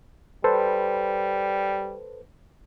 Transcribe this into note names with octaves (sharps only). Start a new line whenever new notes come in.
G3 A4 B4 C5